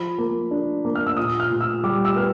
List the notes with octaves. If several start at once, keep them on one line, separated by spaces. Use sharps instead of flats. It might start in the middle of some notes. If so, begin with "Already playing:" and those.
Already playing: F3 B5
A#3
D4
A#3
F6
E6
A#2 D#6
F6
A#2
E6
G3 D6
E6
B3 F6